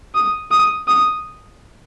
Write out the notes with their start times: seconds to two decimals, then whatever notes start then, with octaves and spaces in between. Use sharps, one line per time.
0.15 D#6
0.51 D#6
0.88 D#6